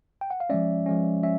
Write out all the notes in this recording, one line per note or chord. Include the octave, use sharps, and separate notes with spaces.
G5
F#5
F5
F3 G#3 C#4 D5 E5
F3 G#3 C#4
C#4 E5